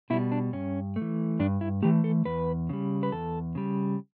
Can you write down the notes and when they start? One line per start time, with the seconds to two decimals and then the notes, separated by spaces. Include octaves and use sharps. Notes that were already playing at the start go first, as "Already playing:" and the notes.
0.10 B2 G3 E4
0.32 D4
0.53 G2 C#4
0.96 A3
1.02 E3
1.40 G2 D4
1.61 E4
1.82 E3 A3 G4
2.04 A4
2.25 E2 B4
2.69 C#3 G3
3.03 B4
3.12 E2 A4
3.55 C#3 G3